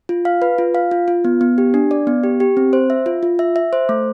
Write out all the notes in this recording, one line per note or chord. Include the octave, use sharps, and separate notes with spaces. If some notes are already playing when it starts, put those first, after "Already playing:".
F4
F5
B4
F4
F5
F4
F4
B3
B3
G4
D4
D5
B3
G4
G4
C4
C5
E5
F4
F4
E5
E5
C5
A3